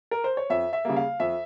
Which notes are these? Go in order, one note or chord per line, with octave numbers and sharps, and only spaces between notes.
A#4
C5
C#5
F2 E5
E5
C#3 G3 A#3
F5
F2 E5